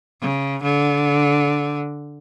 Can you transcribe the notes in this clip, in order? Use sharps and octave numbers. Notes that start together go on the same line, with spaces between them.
C#3
D3